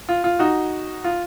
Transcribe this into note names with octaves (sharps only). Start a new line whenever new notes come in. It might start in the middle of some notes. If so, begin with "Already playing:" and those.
F4
F4
D#4 F#4
F4